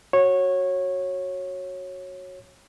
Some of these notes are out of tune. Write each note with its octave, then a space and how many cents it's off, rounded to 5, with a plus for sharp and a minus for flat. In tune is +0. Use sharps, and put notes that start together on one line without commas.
F#4 +0 C#5 -15